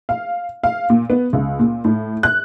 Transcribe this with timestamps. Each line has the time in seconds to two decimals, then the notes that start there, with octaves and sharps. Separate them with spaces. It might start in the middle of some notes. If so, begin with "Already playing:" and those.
0.09 F5
0.64 F5
0.90 A#2
1.10 B3
1.33 C#2
1.59 A#2
1.85 A2
2.23 F#6